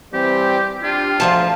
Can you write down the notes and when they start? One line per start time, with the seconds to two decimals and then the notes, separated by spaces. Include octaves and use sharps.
0.14 E3 G3 C4 G4
0.83 D4 F4 G4
1.20 D2 A#2 F3 A5